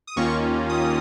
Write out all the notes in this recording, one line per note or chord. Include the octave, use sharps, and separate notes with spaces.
D#6
D#2 D#3 A#3 C#4 F4 C#6
D#6